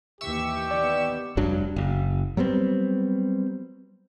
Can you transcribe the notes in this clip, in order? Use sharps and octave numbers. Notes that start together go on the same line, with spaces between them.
D#2 E3 G4 E5 C#6 E6
D#3 B3 D5
F1 G2 F#3 D4
F#1
F#3 G3 B3 C4